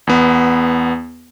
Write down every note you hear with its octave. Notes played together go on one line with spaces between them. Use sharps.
E2 B3